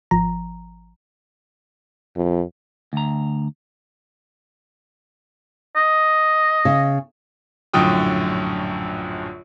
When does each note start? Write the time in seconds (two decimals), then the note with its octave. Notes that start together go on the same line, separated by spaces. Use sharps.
0.11 G#1 F3 A#5
2.16 F2
2.93 D2 A#5
5.76 D#5
6.65 C#3
7.73 A#1 F#2 A2 D3 G5 D#6